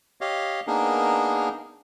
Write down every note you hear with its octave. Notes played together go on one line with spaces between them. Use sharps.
G4 C#5 D#5 F5
A#3 B3 D4 D#4 G#4 A#4